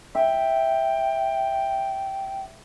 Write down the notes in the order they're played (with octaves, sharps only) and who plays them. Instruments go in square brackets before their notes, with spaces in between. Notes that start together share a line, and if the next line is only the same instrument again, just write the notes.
[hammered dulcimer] E5 [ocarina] G5